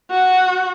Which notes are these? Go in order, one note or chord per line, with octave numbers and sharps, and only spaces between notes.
F#4